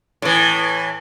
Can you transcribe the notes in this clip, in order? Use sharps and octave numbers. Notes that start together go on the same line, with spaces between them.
A2 E3